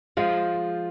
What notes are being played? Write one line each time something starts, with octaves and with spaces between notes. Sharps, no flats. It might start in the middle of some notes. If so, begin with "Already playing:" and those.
F3 G#3 F4